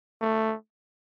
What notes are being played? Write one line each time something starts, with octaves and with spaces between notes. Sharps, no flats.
A3